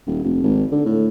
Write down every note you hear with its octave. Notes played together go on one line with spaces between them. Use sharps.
D#1
F1
G#1
D3
A2